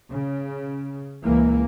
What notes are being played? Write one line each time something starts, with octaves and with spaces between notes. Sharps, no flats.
C#3
C#2 E3 A#3